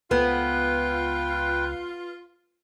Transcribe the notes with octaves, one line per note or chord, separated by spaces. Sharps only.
C#2 B3 F4 B4 G5